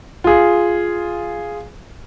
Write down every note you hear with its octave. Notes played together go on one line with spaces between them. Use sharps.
F4 G#4